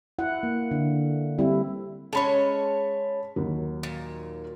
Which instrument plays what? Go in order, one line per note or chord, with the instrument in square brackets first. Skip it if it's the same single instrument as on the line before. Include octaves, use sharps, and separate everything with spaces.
[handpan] E4 F#5
A#3
D3
G3 C4 E4
[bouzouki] G#3 C#4 C#5 [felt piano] A5 B5
[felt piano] D#2 F#3
[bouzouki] A#2